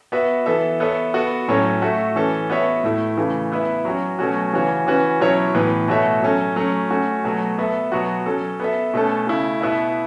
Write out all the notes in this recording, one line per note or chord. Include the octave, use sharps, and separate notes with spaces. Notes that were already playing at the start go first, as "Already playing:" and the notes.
B3 F#4 B4 E5
E3 B3 A4 E5
B3 A4 C#5 E5
B3 F#4 A4
A2 F#3 C#4 A4 C#5
A3 F#4 A4 E5
E3 C#4 A4
B3 F#4 C#5 E5
A2 A3 E4
C#3 E3 A3
B3 E4 B4 E5
F#3 C#4 F#4
B2 F#3 A3 C#4 F#4
C#3 E3 C#4 F#4 C#5
E3 C#4 F#4 B4
B2 F#3 C#4 E4 C#5
A2 E3 B3
B2 A3 F#4 C#5 E5
F#3 C#4 A4
F#3 A3 C#4
A3 C#4 F#4
B2 F#3 A3 F#4
B3 A4 E5
B2 F#3 B3 F#4
F#3 C#4 A4
B3 A4 E5
B2 A3 C#4 A4
C#3 A3 E4
B2 B3 E4 B4 E5